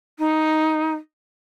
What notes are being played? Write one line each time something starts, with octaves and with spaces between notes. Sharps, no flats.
D#4